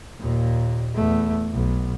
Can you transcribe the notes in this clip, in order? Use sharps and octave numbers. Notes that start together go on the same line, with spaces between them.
D#2 A#2
E2 A3
B1